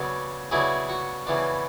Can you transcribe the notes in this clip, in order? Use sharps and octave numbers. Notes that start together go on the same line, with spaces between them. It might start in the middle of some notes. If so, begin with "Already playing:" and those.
Already playing: C#3 F#3 B3 D4
C#3 F#3 B3 D4 E4 G#4
F#4
C#3 E3 B3 D4